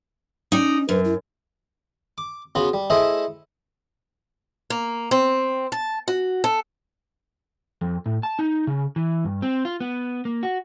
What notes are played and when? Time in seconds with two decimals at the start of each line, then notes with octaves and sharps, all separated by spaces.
0.52 C#4 D#4 D5
0.89 F#2 B4
1.05 E4
2.18 D6
2.55 C#3 B3 F4 F#4
2.74 G3
2.90 A3 E4 G#4 C5 D#5 E5
4.70 A#3
5.11 C4
5.72 A5
6.08 F#4
6.44 A4
7.82 F2
8.06 A2
8.23 A5
8.39 D#4
8.67 C#3
8.96 E3
9.24 G2
9.42 C4
9.65 F4
9.80 B3
10.25 A#3
10.43 F#4